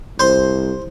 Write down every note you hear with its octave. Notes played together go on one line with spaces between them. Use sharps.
C2 C5 C6